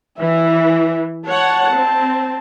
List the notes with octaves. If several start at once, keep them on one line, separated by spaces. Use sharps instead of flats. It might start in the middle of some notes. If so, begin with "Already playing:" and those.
E3 E5
C#5 F#5 A5
C4